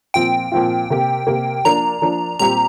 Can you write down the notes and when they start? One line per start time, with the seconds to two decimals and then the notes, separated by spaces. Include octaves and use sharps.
0.14 A#2 F3 C4 F4 G5
0.52 A#2 F3 C4 F4
0.90 C3 A#3 G4
1.27 C3 A#3 G4
1.65 F3 A#3 D4 A#5
2.02 F3 A#3 D4
2.39 A#2 G3 C4 G4 A#5